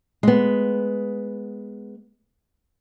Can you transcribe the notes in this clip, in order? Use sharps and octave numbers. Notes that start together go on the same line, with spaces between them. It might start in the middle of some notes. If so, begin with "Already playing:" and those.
G#3 B3